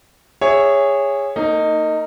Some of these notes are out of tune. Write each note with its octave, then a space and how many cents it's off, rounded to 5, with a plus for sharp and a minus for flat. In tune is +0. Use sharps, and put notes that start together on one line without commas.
G#4 -20 C#5 +0 E5 +0
A#3 -35 D#4 +0